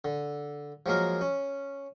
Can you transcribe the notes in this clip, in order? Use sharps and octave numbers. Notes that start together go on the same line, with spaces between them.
D3
F3 F#3 G#3 A#3 A#4
C#4